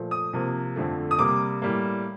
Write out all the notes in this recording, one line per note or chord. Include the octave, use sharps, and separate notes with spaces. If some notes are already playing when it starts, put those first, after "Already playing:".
Already playing: A#2 F3 A3
D#6
C3 F3 A#3
F2 D3 F3 A3
D#6
C3 G3 A#3 D6
A2 G3 A#3